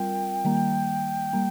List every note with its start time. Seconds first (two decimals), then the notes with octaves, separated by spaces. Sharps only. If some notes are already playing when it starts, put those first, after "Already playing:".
Already playing: G3 C4 F4 A#4 G5
0.45 D#3 G3 A#3
1.33 G3 A#3